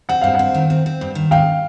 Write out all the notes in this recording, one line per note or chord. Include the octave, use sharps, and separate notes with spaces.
C4 F#5
G2 F5
C4 F#5
D#3
C4
C4
G2
D#3
G#2 F5 G5